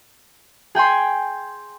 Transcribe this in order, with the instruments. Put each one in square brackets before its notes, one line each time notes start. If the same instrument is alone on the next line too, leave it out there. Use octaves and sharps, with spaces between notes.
[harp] G#4 G5 G#5 C6